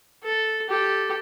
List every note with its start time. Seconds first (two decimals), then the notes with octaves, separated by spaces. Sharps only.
0.24 A4
0.69 G4 A4